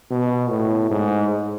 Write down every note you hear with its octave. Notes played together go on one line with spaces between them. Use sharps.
B2
A2
G#2